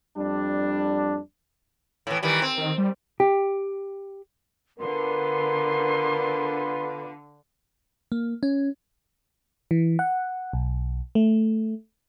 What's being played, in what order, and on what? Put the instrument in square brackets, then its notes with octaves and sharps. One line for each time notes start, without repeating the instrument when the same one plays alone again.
[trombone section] F2 G3 D4
[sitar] A2 E3
D#3 E3 G3
C4
[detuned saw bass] D#3
G3
[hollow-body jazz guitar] G4
[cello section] D3 [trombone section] B3 F4 B4 [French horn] A#4 [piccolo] C6
[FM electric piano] A#3
C#4
E3
F#5
B1
A3